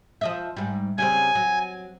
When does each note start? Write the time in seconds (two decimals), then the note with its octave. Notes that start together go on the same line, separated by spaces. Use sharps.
0.21 F3 D#5 E5
0.56 G#2 G3
0.98 C#3 G3 C4 G#5
1.35 F#3